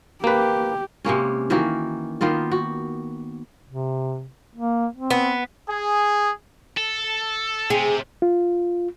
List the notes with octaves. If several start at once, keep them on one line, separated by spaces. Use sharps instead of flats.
A#3 G4 B4
C3 G#3 A#3 C#4
D#3 E3 A#3 F#4
D#3 A#3 B3 F4
F#4
C3
A#3
C4
B3
G#4
A4
C3 G#4
F4